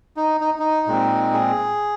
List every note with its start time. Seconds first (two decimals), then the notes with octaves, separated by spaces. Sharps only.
0.17 D#4
0.41 D#4
0.59 D#4
0.87 A#2 G#3 C4
1.33 G#4